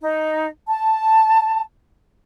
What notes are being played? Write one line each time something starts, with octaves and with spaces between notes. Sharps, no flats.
D#4
A5